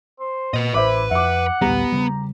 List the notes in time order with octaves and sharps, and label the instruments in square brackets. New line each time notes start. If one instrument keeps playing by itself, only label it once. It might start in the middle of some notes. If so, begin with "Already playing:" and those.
[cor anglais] C5
[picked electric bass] A#2 [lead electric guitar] B4 D#5
[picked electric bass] A1 [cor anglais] E4 [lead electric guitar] B4 [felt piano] C5 E5 D6
[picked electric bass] F2 [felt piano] E5 D6 [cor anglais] F#5
[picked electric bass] A1 D2 G3 [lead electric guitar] B3 [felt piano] G4 A#5
[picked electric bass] C#3 G3